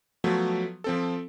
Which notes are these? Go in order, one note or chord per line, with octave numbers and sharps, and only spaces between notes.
F3 F#3 A3 B3
F3 C4 A4